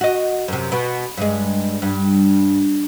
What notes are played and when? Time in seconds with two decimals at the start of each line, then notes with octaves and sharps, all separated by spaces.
0.01 F#4 D#5
0.48 F#2 C3
0.72 B2
1.17 G2 G#3
1.82 G2